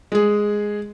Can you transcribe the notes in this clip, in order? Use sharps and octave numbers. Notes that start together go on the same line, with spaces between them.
G#3 G#4